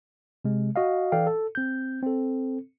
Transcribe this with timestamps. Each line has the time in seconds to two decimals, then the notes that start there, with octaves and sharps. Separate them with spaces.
0.45 C3 G#3
0.76 F#4 D#5 F5
1.12 E3 A4 D5 F5 G5
1.27 A4
1.55 C4 G6
2.03 C4 A4